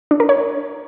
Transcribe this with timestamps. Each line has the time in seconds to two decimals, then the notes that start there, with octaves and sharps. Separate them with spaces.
0.11 D4
0.20 A#4
0.29 C#5